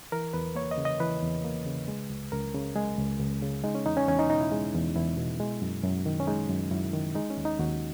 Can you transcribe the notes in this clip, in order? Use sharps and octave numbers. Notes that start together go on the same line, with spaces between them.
E3 A#4
E2 B4
A#3 C#5
D#5
C#3
D#5
E3 B4
E2
A#3
C#3
G#3
C#2
C#2 A#4
C#3
G#3 G#4
C#2
C#2
C#3
G#3 D#4
C#4
E2 D#4
C#4
E2 C#4
D#4
B2 D#4
E4
G#3
E2
E2 E4
B2
G#3
F#2
F#2
D#3
C#4
G#3 D#4
F#2
F#2 E4
D#3
G#3 D#4
C#4
D#2
D#4
D#2 F#4